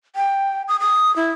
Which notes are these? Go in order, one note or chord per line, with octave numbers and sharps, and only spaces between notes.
G5
D#6
D#6
E4